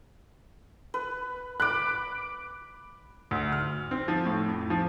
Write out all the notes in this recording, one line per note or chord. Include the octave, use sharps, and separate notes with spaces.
B4
B5 D6 F#6
D2
F6
C4
F3
A2
F2
F3